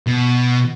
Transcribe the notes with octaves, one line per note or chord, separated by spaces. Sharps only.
B2